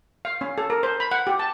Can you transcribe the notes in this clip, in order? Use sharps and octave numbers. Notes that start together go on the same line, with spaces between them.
F5
C#4
A4
A#4
C5
B5
F#5
G4
A5